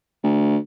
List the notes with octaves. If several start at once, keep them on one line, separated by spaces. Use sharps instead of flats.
D2